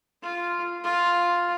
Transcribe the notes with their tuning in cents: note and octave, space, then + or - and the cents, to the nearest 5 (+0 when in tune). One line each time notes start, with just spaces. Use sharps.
F4 -5
F4 +0